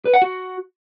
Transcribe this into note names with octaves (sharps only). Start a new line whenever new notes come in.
B4
F#5
F#4